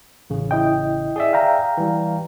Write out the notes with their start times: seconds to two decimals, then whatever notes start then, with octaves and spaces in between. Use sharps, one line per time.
0.30 A1 C#3
0.51 E4 D#5 G5
1.16 G#4 D5 E5
1.33 F5 G5 A#5
1.77 E3 G3